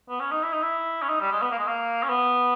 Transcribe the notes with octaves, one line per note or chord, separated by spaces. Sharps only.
B3
C#4
D#4
E4
D#4
E4
C#4
D#4
G3
G#3
B3
A#3
G#3
A#3
C#4
B3